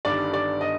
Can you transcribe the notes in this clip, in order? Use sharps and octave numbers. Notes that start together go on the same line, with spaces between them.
G1 G2 D#3 G3 D5
D5
D#5